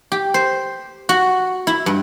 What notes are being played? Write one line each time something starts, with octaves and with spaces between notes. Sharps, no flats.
G4
C5
F#4
E4
G2